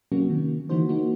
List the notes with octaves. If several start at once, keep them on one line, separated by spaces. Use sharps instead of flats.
C3 F#3 A#3 C#4 F#4
D#3
D3 E3 A#3 D#4 F#4 C5
A#3 D#4 F#4